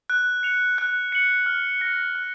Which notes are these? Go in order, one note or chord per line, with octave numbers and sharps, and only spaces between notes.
F#6
C#7 F7
F#6
C#7 F#7
F6
A#6 C#7
F#6